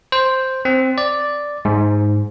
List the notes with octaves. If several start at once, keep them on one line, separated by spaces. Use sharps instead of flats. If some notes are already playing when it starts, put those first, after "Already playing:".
C5
C4
D5
G#2